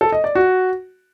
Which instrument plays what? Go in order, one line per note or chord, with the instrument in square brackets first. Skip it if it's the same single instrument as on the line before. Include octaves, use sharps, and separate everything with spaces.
[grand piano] A4
D#5
D5
F#4